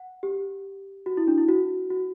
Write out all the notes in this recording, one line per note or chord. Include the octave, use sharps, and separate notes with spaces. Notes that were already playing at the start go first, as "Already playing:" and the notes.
Already playing: F#5
G4
F#4
E4
D4
E4
F#4
F#4